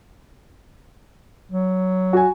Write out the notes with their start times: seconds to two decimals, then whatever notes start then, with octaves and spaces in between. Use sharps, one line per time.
1.52 F#3
2.13 F#4 G#5